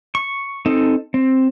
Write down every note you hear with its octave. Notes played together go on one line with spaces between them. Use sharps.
C#6
C4 D#4 A4
C4